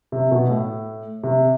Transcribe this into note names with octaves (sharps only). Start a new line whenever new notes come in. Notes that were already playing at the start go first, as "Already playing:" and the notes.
C3
B2
A2
C3